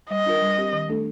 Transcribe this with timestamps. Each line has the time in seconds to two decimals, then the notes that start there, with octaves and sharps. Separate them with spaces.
0.10 G3 D#5
0.26 D4 F4 A#4
0.42 G3
0.58 C4 G4
0.72 D#3
0.89 A3 D4 A4